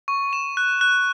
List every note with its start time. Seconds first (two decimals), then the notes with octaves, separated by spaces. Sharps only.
0.08 C#6
0.33 E7
0.57 F#6
0.81 F#6